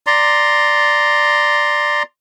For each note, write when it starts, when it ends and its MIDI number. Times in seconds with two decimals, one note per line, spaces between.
0.07 2.03 74
0.07 2.03 82
0.07 2.03 84